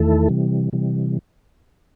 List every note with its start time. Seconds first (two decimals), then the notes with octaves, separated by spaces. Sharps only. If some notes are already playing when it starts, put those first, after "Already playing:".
Already playing: E2 D#3 A3 E4 A4
0.28 C3 E3 G3
0.73 C3 E3 G3